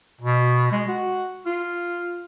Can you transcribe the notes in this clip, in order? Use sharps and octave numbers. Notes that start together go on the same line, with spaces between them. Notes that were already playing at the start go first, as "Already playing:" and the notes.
B2
G#3
F#4
F4